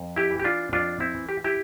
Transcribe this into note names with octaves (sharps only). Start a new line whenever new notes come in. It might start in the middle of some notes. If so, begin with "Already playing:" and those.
Already playing: F2
E4 G4
E3
G4
D4 F4
F2 D4 F4
C4 E4
E3
G4
E4 G4